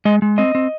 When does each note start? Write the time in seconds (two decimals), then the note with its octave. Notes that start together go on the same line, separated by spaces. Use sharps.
0.05 G#3 D#5
0.22 G#3
0.38 C4 D#5
0.55 C4